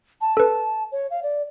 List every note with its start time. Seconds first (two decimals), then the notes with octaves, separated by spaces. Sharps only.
0.21 A5
0.37 A4 B4
0.92 C#5
1.10 F5
1.23 D5